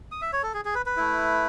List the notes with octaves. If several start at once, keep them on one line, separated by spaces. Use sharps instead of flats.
D#6
E5
C#5
A4
G#4
G#4
B4
B4
A3 E4